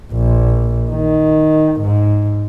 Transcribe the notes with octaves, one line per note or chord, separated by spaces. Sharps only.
A#1
D#3
G#2